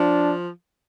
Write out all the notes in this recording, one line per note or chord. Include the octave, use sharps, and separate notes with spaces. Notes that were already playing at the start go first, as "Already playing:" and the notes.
Already playing: F3 D4